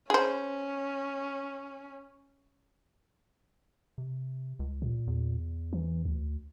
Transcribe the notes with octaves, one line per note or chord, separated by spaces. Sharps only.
C#4 G#4 C5
C3
C#2
A#2
E2
E3
D2